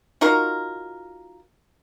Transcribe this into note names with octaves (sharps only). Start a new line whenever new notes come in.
D#4 F4 F#4 A#4